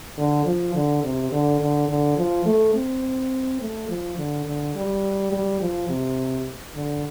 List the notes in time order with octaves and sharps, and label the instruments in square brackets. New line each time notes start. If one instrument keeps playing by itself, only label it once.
[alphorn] D3
F3
D3
C3
D3
D3
D3
F3
A3
C4
A3
F3
D3
D3
G3
G3
F3
C3
D3